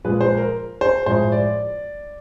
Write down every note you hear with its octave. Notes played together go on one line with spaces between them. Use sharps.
A#2 F3 G#3 B4
C5
A#4
C5
A2 F3 G#3 C5
D5